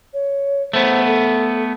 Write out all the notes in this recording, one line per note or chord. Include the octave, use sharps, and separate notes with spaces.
C#5
A3 B3 C5
A4